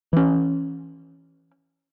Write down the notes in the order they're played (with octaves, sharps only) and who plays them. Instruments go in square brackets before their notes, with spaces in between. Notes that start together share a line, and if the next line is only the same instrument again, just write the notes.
[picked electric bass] E3 C#4